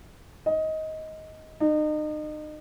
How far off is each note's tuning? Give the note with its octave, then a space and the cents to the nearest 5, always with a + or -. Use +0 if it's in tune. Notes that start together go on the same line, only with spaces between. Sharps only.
D#5 +15
D#4 -35